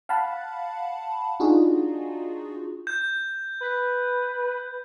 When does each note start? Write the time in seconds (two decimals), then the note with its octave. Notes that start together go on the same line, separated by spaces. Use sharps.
0.09 F5 F#5 A5 B5
1.40 D4 D#4 F4 F#4 G#4
2.87 G6
3.61 B4